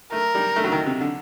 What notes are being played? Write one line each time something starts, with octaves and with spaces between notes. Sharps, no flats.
A3 A#4
G3
A3
F#3
D#3
C3
D3